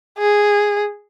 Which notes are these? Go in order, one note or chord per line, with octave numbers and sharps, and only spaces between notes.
G#4